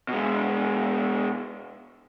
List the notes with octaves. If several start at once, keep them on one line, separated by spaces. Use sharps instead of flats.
B2 G#3